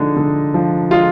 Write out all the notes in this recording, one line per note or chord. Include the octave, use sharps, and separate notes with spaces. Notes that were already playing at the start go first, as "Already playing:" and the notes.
Already playing: D3 F3 G#3 D4 D#4
D3
F3
G#3 F4